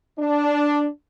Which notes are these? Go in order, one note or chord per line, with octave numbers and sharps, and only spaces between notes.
D4